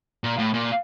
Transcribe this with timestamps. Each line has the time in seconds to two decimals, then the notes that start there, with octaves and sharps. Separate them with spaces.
0.24 A#2
0.39 A2
0.54 A#2